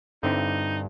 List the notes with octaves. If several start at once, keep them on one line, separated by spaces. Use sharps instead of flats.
G2 D3 C4 D#4 E4